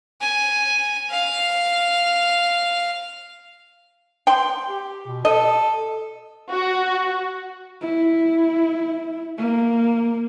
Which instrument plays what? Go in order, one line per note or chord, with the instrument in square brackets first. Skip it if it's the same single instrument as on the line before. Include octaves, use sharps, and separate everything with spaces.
[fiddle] G#5
F5
[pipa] G5 C6
[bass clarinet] G4
B2
[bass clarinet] A4 [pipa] D#5
[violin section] F#4
[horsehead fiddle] E4
A#3